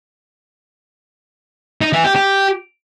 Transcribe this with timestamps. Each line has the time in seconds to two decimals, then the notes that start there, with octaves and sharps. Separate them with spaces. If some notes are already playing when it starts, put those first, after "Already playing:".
1.81 D#4
1.93 E3
2.04 G4
2.16 G4